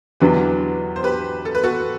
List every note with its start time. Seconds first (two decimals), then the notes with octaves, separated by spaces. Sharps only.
0.20 E2 D3 F#3 B3 D4 G4 B4
0.96 C5
1.03 G4 B4
1.45 A4
1.55 B4
1.64 F#4 A4